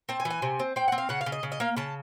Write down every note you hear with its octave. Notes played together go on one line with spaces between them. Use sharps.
C4 A5
G#5
E3
G#5
C3
C4
C4 G5
C4 F#5
F5
C#3 F#5
F5
C#3
D#5
C#3
D#5
A#3 F5
C#3 A5